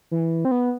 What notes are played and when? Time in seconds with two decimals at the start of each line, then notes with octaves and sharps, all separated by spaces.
0.11 E3
0.45 C4
0.51 B3